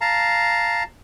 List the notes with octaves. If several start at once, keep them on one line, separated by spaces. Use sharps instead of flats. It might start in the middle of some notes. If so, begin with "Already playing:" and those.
F5 A5 A#5